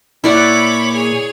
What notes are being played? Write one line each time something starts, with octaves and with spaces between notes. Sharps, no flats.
A#2 E4 C#5 D5 F#5 B5 D6
G#4 C#5